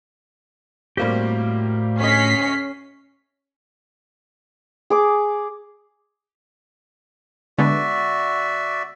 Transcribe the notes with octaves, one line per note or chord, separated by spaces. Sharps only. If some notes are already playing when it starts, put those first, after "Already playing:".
A2 G3 A#3 C4 F#4 G4
D2 C#4 C#5 D#5 B6 C7
G#4 D6
D3 G#3 B3 F#4 D5 E5